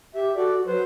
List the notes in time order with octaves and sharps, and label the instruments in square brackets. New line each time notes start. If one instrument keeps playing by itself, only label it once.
[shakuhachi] G4 [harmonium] E5
[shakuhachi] F#4 [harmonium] A4 D5
[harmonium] F#3 C5 [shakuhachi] B4